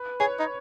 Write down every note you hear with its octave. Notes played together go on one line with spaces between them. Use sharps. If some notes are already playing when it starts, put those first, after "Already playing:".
Already playing: B4
G#4 C#5
D#4